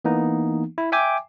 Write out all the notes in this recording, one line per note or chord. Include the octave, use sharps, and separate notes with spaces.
E3 A#3 B3 D#4
E4
E5 G5 G#5 D6